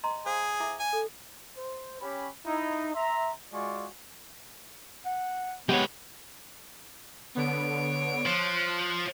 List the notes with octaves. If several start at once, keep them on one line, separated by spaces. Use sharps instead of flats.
D#5 A#5 C6
G#4 C5 F5
E4 E5 D6
G#5
A4
C5
C#4 G4 B5
D#4 E4
E5 A#5 C6
G#3 F4 F#4 D5 G#5 C#6
F#5
G#3 B3 G4 B4 C#5
D3 B3 C#5 D7
F3 C6 F#6